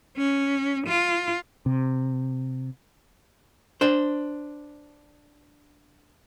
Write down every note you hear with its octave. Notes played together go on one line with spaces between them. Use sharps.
C#4
F4
C3
D4 C5